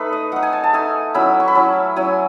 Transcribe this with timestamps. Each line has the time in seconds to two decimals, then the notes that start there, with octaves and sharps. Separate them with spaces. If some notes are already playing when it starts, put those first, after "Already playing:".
Already playing: A3 D#4 A4 B4
0.12 D#5
0.32 A3 D#4 F#5
0.43 G#5
0.53 A5
0.64 A5
0.73 A3 D#4 G#5
1.14 F#3 C#4 E4 B5
1.40 C#6
1.48 B5
1.55 F#3 C#4 E4 A5
1.96 F#3 C#4 E4 G#5